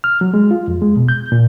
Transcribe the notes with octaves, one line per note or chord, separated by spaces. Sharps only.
F6
F#3
G#3
F4
F2
G#3
B2
G6
A#2